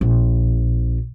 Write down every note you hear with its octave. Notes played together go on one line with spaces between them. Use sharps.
A#1